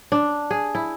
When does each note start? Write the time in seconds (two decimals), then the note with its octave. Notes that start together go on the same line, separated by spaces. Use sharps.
0.12 D4
0.51 G#4
0.75 E4